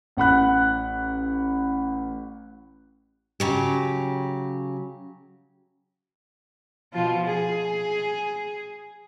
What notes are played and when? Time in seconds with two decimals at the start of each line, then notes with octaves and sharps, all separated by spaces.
0.17 A1 F#5 B5 F#6
3.40 C#3 F#3 G4
6.93 B2 F3 F4
7.25 G#4